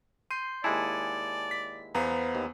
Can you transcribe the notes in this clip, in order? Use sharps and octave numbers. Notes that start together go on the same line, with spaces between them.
C6 G6 C7 D#7
D#2 G#3 E4 D5 G#5 A5 C#7
B6
E2 B3 C5 F5 A#5
D#2